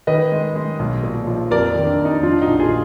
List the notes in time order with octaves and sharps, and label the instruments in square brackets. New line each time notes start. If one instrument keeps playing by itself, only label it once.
[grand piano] D#3 B4 D#5
G#3
G#3
B1
A#2
F3
F2 A#4 D5
D#3
D4
F2
D#4
F3 D4 F4
D#4 F#4
A#1
F4 G#4